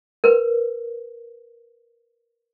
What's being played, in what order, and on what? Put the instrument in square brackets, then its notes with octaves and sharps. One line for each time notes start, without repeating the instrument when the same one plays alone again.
[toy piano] A#4 B4